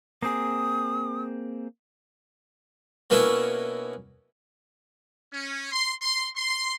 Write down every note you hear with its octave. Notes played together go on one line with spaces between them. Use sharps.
A#3 C4 G#4 D#6
B2 A#3 B3 C#4 D4 E4
C#4
C6
C6
C6